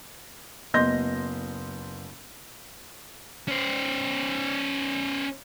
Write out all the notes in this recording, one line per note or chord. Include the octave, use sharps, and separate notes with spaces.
F#1 B3 D#5 C6 G6 A#6
C#4 C5